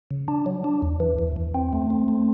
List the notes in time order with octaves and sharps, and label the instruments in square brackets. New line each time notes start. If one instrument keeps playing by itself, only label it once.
[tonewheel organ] C#3
D4
F#3
D4
E2
E3
E2
E2
C4
A3
C4
A3